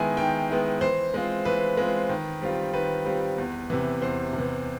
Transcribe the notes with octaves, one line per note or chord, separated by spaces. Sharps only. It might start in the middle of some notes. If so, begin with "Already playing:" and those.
Already playing: D#3 G#3 B3 E4 G#5
D#3 G5
G#3 B3 E4
E3 C5
G#3 C4 F4
E3 B4
G#3 C4 F4
D#3
G3 C4 F4
D#3 B4
G3 C4 F4
E2
C3 E3
E2 C5
C3
E3